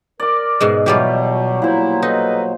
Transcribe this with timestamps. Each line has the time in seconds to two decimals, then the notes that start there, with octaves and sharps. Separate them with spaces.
0.20 A#4 D5 D6
0.60 G#2 B2 G#3
0.86 B2 E3 F#3 G3 F4 G4 G5
1.62 A#2 E4 C5
2.02 D#4 A4 B4 D#5